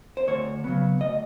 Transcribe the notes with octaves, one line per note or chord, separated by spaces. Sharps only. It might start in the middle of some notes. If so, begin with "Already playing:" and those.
C5
D2 C#5
C#3 F#3 B3
D2 D#5